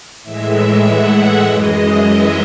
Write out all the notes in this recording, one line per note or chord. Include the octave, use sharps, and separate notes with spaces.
A2 E3 G#3 E5
E5
F#5
E5
F#2 E3 G#3 D#5
E5